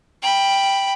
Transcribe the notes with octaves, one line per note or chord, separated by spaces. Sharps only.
G5 B5